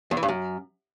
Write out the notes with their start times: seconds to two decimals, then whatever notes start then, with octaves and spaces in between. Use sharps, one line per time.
0.11 E2
0.17 E3
0.23 G2
0.28 F#2